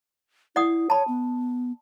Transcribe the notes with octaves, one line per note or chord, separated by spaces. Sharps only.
E4 D5 F#5 D#6
C#5 A5 B5
B3